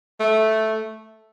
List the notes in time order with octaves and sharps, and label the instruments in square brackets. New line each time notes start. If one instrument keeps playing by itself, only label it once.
[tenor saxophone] A3